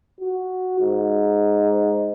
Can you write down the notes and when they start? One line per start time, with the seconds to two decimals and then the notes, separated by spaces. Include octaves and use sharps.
0.21 F#4
0.81 G#2